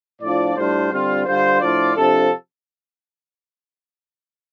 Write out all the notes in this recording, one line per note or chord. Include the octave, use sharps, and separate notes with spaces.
A2 F3 D4 F4 D5
A2 G3 D4 F4 C5
D3 G3 C4 F4
D3 G3 F4 C5
A2 F3 D4 F4 D5
C3 F3 D4 A4